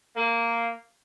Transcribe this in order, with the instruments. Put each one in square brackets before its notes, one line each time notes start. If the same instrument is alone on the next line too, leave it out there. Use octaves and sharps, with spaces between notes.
[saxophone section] A#3